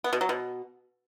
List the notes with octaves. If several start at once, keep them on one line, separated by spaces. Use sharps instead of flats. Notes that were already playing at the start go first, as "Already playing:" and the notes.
B3
B2
F#3
B2